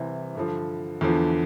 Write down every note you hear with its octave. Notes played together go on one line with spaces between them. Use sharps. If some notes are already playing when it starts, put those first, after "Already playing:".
Already playing: C2 C3 E3
G2 D3 F3
E2 D3 F3